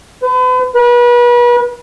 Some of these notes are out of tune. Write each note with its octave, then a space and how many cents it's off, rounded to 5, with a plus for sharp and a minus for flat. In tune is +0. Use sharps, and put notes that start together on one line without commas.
B4 +40
B4 -35